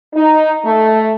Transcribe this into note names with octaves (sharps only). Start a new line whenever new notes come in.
D#4
A3